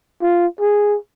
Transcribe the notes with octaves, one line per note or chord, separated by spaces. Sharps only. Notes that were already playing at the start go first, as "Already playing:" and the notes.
F4
G#4